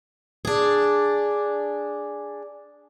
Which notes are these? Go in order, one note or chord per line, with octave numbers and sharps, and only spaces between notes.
D4 G#4